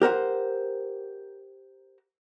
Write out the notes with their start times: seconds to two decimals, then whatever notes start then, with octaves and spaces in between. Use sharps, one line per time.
0.02 G4 A#4 C5 F#5